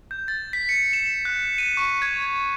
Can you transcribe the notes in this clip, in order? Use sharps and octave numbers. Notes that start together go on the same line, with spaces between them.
G6
A6
B6
C#7
E7
F#6
D#7
C#6
G#6